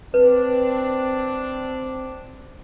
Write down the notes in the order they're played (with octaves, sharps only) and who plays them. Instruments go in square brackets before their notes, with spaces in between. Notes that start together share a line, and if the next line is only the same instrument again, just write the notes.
[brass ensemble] C4 D4 [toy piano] B4